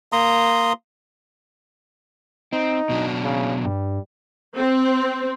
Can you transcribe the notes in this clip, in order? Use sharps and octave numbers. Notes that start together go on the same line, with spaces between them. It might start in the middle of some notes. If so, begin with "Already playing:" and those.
A#3 A#5 C6 D#6
C4 D#4
B2 F#3 D4
C#3
G2 G3
C4